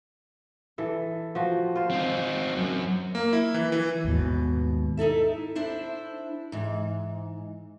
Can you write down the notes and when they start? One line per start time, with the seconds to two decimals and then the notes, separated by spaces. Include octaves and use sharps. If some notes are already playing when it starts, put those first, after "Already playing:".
0.78 E3 A4
1.35 F3 F#4
1.76 F4 C5
1.91 C4 D#4
2.56 F#2 F#3
3.15 A#3
3.33 E4
3.54 E3
3.72 E3
4.05 D#2 G#2 B2
4.97 D#4 E4 A4 E5
5.55 D4 E4 C5
6.52 G#2 E3